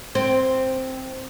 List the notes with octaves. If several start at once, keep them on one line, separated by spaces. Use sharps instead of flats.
C4